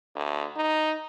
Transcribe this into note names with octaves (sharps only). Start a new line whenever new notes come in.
D2
D#4